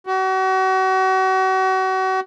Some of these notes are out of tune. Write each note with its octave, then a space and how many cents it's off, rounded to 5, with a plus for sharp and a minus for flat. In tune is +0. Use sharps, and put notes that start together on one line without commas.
F#4 +35